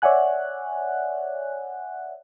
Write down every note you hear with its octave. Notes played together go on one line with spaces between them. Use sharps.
C#5 D5 E5 F#5 G#5 F#6